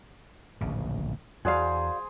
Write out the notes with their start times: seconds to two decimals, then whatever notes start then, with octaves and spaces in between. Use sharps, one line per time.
0.61 D1 A#1 C#3
1.45 E2 F#4 G#4 C5 D5 F5